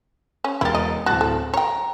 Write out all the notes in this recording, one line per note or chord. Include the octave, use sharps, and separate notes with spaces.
C#4
E1 E4 G4 A#4 A6
D#5
D1 F#4 A5 F#6
A4
C#5 G5 A#5